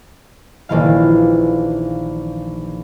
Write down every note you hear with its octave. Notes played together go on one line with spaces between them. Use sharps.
A#1 D#3 E3 F5